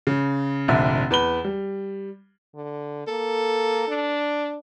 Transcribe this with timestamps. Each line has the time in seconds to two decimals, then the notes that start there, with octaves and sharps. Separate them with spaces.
0.07 C#3
0.68 F1 A#1 D3 E5
1.10 E2 B4 B5 G7
1.44 G3
2.55 D3
3.08 A#3 A4
3.88 D4